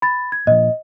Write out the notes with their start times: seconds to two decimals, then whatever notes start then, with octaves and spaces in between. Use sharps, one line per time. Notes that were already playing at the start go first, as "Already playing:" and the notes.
0.02 B5 A6
0.32 G#6
0.47 A#2 F3 D#5